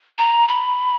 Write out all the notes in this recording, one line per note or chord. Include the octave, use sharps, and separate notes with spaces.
A#5
B5